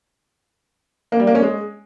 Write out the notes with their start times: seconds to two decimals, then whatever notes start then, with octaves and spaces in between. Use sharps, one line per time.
1.12 A#3
1.20 G3
1.27 A#3
1.35 C#4
1.42 G#3